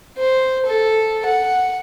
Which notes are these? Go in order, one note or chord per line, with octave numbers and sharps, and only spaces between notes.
C5
A4
F#5